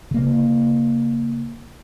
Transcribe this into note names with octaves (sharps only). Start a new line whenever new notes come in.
C#3 A#3